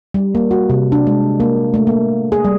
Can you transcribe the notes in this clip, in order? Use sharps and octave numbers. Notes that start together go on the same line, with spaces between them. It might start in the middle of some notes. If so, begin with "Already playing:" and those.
G3
A#3
F#4
C3
D4
G#3
A#3
A3
A#3
G#4
G3